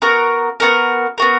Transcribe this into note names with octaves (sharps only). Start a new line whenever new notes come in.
B3 F#4 A#4
B3 F#4 A#4
B3 F#4 A#4